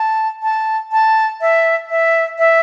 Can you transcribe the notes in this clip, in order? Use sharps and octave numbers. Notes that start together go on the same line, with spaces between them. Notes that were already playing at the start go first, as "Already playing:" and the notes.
Already playing: A5
A5
A5
E5
E5
E5